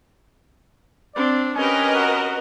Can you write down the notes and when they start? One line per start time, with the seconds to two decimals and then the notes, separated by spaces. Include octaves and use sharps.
1.15 C4 D4 D5
1.56 C#4 G4 A#4 B4 D#5 G#5
1.95 F#4